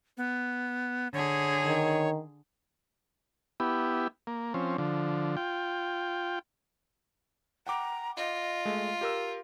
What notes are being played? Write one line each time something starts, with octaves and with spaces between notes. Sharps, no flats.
B3
D3 G#4 C#5
D#3
B3 E4 G4
A#3
F3 C4 C#4
D3 F3
F4 G5
F#5 G5 A#5 D6
F4 D#5
G#3 A3
G4 A#4 E6